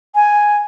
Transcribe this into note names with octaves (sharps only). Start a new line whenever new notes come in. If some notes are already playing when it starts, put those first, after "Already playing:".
G#5